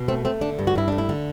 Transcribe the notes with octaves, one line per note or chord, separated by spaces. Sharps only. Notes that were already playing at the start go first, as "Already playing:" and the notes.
Already playing: B2
A3 C4
A3 C4
D3 D4
G2
F#4
G2 E4
A3 D4
E4
D3